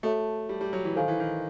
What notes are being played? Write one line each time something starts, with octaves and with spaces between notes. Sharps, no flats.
A3 F#4 A4 C#5 E5 A5
G3
G3
F#3
E3
D#3 A4 C5 F5 G#5
E3
D#3